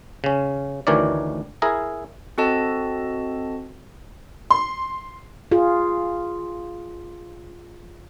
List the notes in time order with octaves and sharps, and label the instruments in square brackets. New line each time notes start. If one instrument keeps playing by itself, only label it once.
[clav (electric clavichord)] C#3 C#4
D2 D#3 E3 A#4 C#5 D5
E4 G#4 A#4 A#5
[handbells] C4 F#4 A4 D#5 A5
[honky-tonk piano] C6
[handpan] F4 G#4